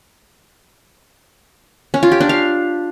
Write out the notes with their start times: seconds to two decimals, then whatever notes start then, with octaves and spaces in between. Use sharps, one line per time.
1.94 C#4
2.03 F4
2.12 G4
2.20 D4
2.29 F5